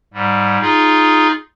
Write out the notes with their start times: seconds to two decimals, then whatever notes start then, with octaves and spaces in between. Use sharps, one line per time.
0.14 G#2 G3
0.62 D#4 F4 G#4